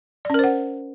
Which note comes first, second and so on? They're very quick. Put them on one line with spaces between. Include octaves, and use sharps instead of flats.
D5 C#4 A#4 C5 F#5